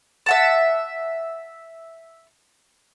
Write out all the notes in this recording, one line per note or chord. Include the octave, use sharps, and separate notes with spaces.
E5 F#5 A5